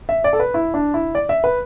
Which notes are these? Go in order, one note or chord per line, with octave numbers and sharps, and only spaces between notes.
E5
D5
A4
B4
E4
D4
E4
D5
E5
B4